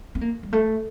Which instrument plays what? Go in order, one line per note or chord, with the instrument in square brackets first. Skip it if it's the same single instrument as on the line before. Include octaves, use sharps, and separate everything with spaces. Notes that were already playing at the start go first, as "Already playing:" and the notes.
[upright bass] C4
A#3
G3
A3